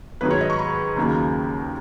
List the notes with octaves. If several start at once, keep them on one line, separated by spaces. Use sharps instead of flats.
G#2 D#3 F#3 B4
C#5
D#5
C#6
B5
D#2 C#3 F#3 A#3 D#4